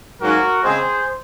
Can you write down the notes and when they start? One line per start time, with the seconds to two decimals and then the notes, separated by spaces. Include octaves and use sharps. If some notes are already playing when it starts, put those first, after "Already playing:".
0.21 G#2 F#3 A#3 C#4 F#4 A#4
0.63 C#3 G#3 C4 G#4 C5